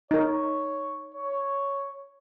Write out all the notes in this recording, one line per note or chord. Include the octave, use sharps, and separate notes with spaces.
D#4 A#4 C#5
C#5